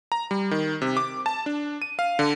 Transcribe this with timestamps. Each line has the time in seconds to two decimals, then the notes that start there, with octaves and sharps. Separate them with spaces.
0.12 A#5
0.31 G3
0.51 D#3
0.82 C3
0.97 D6
1.26 A5
1.46 D4
1.82 D#7
1.99 F5
2.19 D3